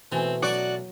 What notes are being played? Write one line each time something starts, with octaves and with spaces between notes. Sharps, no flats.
B2 E3 A3 C4 C6
F#3 F#4 D5 F#5